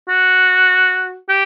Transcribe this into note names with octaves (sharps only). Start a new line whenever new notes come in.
F#4
G4